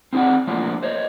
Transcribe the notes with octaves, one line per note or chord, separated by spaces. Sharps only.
C4 D#4 G#4 A4 D5 F#5
F3 F#3 A3 A#3 D4 F4
C5 C#5 D#5